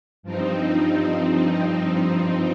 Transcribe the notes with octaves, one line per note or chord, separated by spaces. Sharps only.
G2 F3 C4 D#4